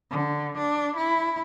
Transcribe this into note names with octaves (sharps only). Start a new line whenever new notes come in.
D3
D4
E4